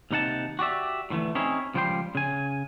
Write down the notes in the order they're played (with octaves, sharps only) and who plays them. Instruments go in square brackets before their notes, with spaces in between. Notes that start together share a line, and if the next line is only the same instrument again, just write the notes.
[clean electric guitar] D#2 C3 D#4 F#5 A5
F#4 G4 D5 E5
A2 D3 E3 A3
C4 C#4 D#4 E4 G#4
C#2 F3 G3 C5 G5 C6
C#3 G#5